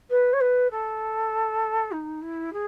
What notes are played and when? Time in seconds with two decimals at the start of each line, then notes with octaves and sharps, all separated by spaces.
0.10 B4
0.33 C#5
0.40 B4
0.70 A4
1.91 D#4
2.21 E4
2.53 G#4